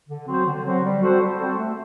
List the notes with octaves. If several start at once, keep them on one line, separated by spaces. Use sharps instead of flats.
D3
F#3 C4 F#4 C5
D3
F#3 C4 F#4 C5
G3
C4 F#4 A4 C5
G3
C4 F#4 A4 C5
A3